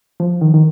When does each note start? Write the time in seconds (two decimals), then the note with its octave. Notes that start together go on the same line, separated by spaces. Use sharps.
0.20 F3
0.41 D#3
0.54 D#3